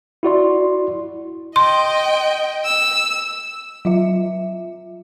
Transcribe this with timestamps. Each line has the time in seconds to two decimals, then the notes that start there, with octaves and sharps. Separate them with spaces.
0.23 E4 F#4 D5 C6
1.56 D#5 G5 C6
2.65 E6
3.85 F#3 F4 E5